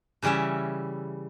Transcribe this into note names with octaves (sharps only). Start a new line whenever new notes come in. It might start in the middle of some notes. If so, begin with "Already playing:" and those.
C#3 E3 G3 C#4 E5